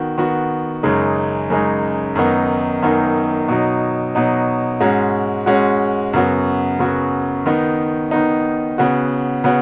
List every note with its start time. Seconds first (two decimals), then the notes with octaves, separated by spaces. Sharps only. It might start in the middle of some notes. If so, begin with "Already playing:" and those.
Already playing: D#3 B3 F#4
0.18 D#3 B3 F#4
0.83 F#2 C#3 G#3 D#4
1.50 F#2 C#3 G#3 D#4
2.15 F#2 D#3 B3 D#4
2.82 F#2 D#3 B3 D#4
3.48 B2 F#3 D#4
4.15 B2 F#3 D#4
4.80 G#2 G#3 C#4 F#4
5.46 G#2 G#3 C#4 F#4
6.13 F#2 C#3 B3 F#4
6.79 F#2 C#3 B3 F#4
7.46 D#3 B3 D#4
8.11 D#3 B3 D#4
8.78 C#3 B3 F#4
9.44 C#3 B3 F#4